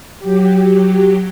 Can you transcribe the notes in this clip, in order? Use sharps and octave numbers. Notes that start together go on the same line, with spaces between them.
F#3 G4